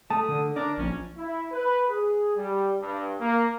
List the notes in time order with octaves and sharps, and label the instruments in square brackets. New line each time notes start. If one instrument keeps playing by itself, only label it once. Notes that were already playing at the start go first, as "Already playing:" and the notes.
[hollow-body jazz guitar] A3 [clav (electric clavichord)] A5 [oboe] D#6
[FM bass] D3
[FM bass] D4 [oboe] A#4 [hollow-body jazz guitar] D5
[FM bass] A#1 [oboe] C#4
[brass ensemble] E4
B4
G#4
G3
G2
A#3